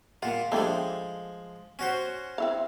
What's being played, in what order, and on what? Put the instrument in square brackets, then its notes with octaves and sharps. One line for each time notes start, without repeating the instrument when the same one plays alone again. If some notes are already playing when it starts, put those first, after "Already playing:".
[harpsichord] A#2 F4 [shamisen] F#5
[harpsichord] F3 G#3 [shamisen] A3 D4 G4
[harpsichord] C#4 F#4 C5
[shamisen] C4 E4 F5